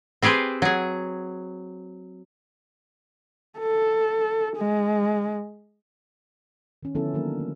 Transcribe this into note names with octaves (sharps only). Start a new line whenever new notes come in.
C4 G4 G#4 B4 C5
F#3 G#4
A4
G#3
D#3 C#4
D3 F3 B3 C#4 E4 A4
D#3 F#3 A#3 D4 A#4
A3